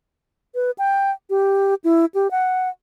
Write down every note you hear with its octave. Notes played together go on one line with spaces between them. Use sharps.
B4
G5
G4
E4
G4
F#5